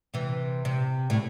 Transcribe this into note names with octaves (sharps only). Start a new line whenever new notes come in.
C3 E3
C3
A2